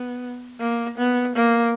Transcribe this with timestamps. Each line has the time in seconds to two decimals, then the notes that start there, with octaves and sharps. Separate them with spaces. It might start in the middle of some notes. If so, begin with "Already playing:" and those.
Already playing: B3
0.59 A#3
0.98 B3
1.36 A#3